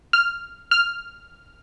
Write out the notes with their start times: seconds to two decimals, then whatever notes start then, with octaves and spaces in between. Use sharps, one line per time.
0.13 F6
0.71 F6